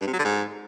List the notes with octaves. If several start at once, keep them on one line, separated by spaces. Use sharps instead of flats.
G2
C3
F#3
D3
G#2